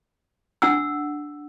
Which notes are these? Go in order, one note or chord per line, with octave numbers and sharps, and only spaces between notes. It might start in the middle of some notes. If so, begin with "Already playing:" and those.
D4 F#5 E6